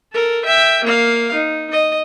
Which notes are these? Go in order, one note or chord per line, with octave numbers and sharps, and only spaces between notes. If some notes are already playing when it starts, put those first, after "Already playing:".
A4 A#4
E5 G5
A#3 F5
D#4
D#5